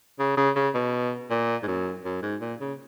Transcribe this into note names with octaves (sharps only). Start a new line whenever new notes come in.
C#3
C#3
C#3
B2
A#2
G#2
F#2
F#2
G#2
A#2
C#3